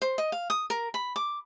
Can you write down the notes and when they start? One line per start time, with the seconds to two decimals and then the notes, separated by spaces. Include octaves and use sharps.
0.02 C5
0.18 D#5
0.32 F5
0.50 D#6
0.70 A#4
0.94 B5
1.16 D6